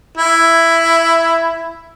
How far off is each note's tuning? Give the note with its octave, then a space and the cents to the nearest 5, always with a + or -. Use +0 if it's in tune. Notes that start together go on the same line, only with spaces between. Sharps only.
E4 +5